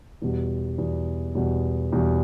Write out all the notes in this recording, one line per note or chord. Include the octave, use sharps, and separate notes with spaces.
E2 B2 G3
E2 B2 G3
E2 B2 G3
E2 B2 G3